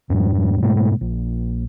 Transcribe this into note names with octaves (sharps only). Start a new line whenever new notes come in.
F2 G#2 G3
G#2 B2 G#3 A3
A#1